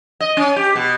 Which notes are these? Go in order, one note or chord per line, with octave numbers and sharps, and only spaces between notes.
D#5
C#4
G4
B2